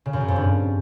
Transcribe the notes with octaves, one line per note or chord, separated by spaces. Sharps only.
C#3
F#2
C#3
F2
G2